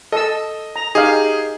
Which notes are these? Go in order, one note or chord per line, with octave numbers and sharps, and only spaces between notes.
A4 D#5 E6
A#5
D#4 G4 G#4 F5